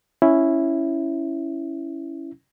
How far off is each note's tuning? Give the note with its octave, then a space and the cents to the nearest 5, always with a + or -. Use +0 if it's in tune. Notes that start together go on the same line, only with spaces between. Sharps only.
C#4 +0 E4 +0